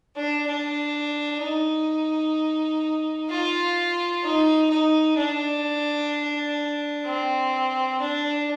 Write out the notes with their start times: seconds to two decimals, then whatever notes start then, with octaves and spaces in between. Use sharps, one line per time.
0.16 D4
0.48 D4
1.42 D#4
3.30 F4
4.24 D#4
4.70 D#4
5.18 D4
7.06 C4
8.00 D4